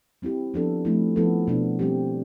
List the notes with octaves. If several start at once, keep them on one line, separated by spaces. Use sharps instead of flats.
G3 C4 E4 G4
F3 B3 D4 A4
F3 A3 C4 E4
F3 B3 E4 A4
B2 B3 D4
G3 C4 G4